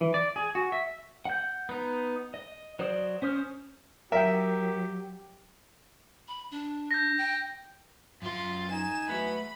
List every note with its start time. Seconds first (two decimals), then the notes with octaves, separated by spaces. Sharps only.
0.01 E3
0.14 D5
0.36 G#4
0.55 F#4
0.72 E5
1.25 F#5 G6
1.69 B3 D#4
2.34 D#5
2.79 F#3 C5 D5 D#6
3.22 C#4 C5 D#6 F6
4.12 F#3 G4 A#4 E5 G5
6.28 B5
6.51 D4
6.91 G6 A#6
7.18 G5
8.22 F#2 F4 C6
8.71 D#4 G#5 E7
9.09 E2 F#3 A3 B3 B5